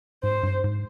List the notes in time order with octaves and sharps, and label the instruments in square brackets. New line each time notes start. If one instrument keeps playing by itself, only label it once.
[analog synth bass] G#2 [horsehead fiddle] C5
[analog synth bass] G2
G#2